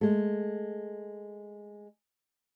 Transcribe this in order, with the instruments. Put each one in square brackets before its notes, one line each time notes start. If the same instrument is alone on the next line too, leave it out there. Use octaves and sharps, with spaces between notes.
[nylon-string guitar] G#3 A3